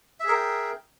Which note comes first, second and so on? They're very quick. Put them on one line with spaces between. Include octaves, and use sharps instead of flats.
E5 G#4 A#4 G5